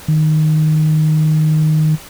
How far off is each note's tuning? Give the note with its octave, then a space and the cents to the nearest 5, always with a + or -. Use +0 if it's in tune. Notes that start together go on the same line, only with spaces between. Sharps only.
D#3 -5